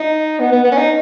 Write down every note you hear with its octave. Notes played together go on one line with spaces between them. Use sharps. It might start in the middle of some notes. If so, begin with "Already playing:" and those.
Already playing: D#4
B3
B3
B3
C#4
D#4